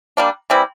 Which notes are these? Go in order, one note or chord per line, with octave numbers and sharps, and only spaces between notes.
G3 A#3 D4
E3 G3 C4 E4